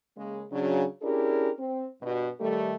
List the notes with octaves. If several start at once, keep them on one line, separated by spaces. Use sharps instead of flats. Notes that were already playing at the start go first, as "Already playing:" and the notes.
C#3 G#3 A#3
C#3 F#3 D4
C#4 D4 E4 G4 G#4 A#4
C4
G2 B2 F#4
D#3 G3 A3